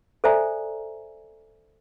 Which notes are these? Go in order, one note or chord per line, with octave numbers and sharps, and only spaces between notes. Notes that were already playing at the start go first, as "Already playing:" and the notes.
A4 C5 D5 E5 G#5 A#5